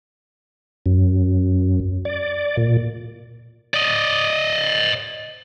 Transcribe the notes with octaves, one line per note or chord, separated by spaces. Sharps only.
F#2
D5
A#2
D5 D#5